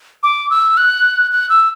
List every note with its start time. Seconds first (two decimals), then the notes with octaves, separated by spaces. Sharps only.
0.23 D6
0.50 E6
0.77 F#6
1.31 F#6
1.49 E6